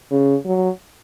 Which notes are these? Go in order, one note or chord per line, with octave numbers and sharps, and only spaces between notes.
C#3
F#3